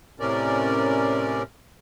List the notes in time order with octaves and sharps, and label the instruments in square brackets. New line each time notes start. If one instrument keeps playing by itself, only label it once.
[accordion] A2 C3 C#4 A#4 D5